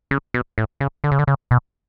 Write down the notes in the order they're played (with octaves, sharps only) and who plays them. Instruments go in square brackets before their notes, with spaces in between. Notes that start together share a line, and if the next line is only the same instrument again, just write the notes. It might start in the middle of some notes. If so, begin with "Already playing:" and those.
[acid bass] C#3
B2
A2
C#3
D3
C#3
D3
C#3
B2